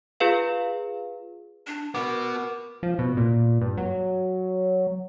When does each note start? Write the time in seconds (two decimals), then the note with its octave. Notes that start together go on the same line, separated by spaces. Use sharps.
0.20 F4 G#4 B4 F5
1.67 D4
1.95 B3 F#4 A#4 D6
2.83 F3
2.98 B2
3.17 A#2
3.61 G2
3.78 F#3